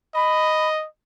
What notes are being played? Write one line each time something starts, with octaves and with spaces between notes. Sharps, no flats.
D#5 B5